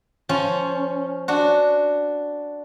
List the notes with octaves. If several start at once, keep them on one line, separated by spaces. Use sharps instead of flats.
F3 C#4
D4 F#4